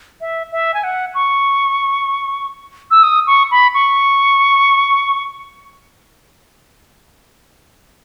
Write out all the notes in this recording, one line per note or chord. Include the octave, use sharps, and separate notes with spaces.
E5
E5
G#5
F#5
C#6
E6
D#6
C#6
B5
C#6